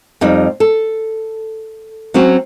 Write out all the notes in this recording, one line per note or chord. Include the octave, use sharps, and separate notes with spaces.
F2 G3 D#4
A4
F#3 C4 C#4 F#4